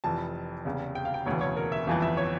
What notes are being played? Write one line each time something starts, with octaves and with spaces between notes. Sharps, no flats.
F1 F2 E3 A5
F1 E2 C#3
G5
F5
G5
E1 D2 C#3 E3 C#5
C#5
A#4
E5
G1 F2 E3 F5
E5
C#5